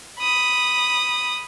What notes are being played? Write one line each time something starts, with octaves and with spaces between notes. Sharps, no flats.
B5 D#6